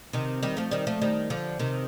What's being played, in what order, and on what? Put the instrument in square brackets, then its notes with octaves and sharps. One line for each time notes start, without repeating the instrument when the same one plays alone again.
[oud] C3 D#3
D#3 G3
F3 A3
D#3 G3
F3 A3
D#3 G3
D3 F3
C3 D#3